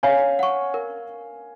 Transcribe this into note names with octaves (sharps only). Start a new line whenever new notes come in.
C#5 F5 G#5
F#5 C#6
A#4